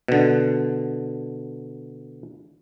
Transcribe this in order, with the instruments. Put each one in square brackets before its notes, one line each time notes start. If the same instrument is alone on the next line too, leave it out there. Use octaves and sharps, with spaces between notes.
[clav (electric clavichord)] B2 D3